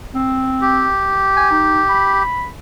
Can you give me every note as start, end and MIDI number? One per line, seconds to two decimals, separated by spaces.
0.15 0.88 60
0.62 2.23 67
1.36 1.47 80
1.51 1.81 63
1.89 2.48 83